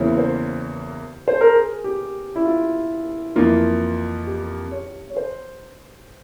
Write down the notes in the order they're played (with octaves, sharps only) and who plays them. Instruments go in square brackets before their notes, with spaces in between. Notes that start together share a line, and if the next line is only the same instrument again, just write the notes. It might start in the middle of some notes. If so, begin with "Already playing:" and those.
Already playing: [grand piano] E2 C#3 E3 A#3 E4 [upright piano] C5 C#5
[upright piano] C5
C5
A#4
G#4
G4
E4
F4
[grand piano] F2 E3 A#3 F4
[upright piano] G4
C#5
C#5
C5